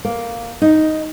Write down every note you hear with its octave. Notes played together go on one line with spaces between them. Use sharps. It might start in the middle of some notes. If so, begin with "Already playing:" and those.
A#3
D#4